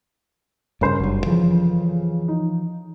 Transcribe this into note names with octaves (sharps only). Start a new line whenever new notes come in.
G2 A#2 C#3 C#4 A#4 C5
F#1 G2 F#3
F2 C#3 E3 F3
D#4